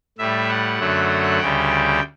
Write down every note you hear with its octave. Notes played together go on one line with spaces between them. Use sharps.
A2 G3 E5
F#5
F#2 D3 F#3 A3
D2 C#3 G3 G5